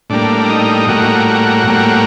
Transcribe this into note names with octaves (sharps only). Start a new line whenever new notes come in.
A2 G3 A#3 D4
D#4
A2 G3 A#3 F#4
F#4
A2 G3 A#3